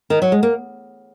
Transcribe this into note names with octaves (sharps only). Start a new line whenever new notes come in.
D#3
F#3
G#3
A#3